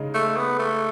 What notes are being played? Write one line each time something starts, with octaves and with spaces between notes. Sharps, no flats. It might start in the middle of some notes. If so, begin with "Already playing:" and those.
Already playing: C#3 G#3 D#4
A3
B3
A3